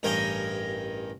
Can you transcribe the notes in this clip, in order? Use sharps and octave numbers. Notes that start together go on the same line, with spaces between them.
A1 G2 A#4 D#5 G5 G#5